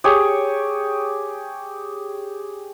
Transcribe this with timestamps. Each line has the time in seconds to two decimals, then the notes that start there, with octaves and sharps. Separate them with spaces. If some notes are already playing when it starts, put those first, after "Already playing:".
0.04 G4 G#4 C#5